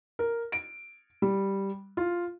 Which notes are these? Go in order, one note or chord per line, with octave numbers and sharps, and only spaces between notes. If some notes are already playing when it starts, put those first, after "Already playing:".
A#4
D7
G3
F4